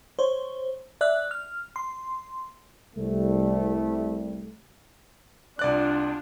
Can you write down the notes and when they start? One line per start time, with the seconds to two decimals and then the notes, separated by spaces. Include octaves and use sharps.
0.19 C5 C#5
1.01 D5 E5 F#6
1.31 F6
1.76 C6
2.97 C2 G3 A3
5.59 C2 D4 F4 D5 F#6